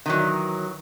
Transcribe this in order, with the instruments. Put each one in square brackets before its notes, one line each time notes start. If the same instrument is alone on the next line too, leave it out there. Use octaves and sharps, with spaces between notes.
[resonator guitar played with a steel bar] D#3 E3 F#3